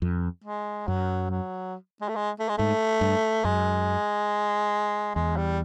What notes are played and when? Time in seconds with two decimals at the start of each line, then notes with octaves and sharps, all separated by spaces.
0.02 F2
0.45 G#3
0.88 F#2 F#3
1.31 F#3
2.01 G#3
2.09 A3
2.16 G#3
2.40 A3
2.49 G#3
2.58 G#2 A3
3.01 G2
3.44 F#2 G#3
5.15 E2 G#3
5.37 G3